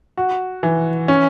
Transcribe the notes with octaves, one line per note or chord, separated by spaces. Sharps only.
F#4
E3
C#4